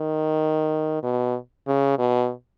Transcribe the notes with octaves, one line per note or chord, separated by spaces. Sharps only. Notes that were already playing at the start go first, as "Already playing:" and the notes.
Already playing: D#3
B2
C#3
B2